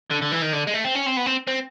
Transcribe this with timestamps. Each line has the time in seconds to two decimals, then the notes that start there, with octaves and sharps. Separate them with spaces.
0.11 D3
0.22 D3
0.32 E3
0.42 D#3
0.53 D3
0.67 G#3
0.74 A3
0.84 C4
0.95 C#4
1.06 C4
1.17 B3
1.26 C4
1.47 C4